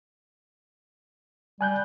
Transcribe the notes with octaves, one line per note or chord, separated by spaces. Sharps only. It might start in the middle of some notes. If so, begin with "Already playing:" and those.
G3 G#5 F#6 G6